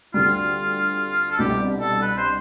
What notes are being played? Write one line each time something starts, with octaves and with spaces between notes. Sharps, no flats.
D2 D3 G3 F4
A4
C2 B2 G3 D4 G4
A4
B4
C5